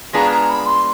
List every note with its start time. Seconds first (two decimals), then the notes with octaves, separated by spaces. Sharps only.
0.13 G#3 B3 D4 F4 G#4 A#5
0.31 A#5
0.49 B5
0.66 C6